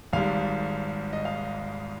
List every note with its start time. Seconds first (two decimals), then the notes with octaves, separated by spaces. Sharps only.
0.13 G#1 G#2 G3 F5
1.13 D#5
1.25 F5